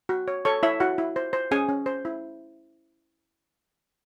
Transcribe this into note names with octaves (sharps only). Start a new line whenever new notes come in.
F#4
C#5
A4 C#5 C#6
E4 C#5 E5
E4 F#4 F#5
E4
C5
C5
C#4 G#4 G#5
C#4
C5
E4